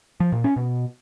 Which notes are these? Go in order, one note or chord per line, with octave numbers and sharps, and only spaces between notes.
F3
A#2
C#4
B2